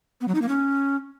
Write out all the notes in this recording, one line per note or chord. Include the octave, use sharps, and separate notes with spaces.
B3
F#3
D#4
A#3
C#4